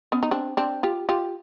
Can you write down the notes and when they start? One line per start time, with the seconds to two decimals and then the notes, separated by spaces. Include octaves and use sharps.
0.12 B3 C#4
0.23 D#4
0.31 C4 D4
0.57 C4 D4
0.83 F4 G4
1.09 F4 G4